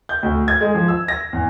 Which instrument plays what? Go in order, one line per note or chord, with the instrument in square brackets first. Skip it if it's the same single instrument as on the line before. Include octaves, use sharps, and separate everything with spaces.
[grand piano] G6
D2
G#6
G#3
F3
E6
A#6
E2